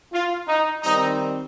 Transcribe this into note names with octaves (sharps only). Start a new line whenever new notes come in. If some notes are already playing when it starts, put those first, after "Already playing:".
F4
D#4
D#3 G3 C4 D#4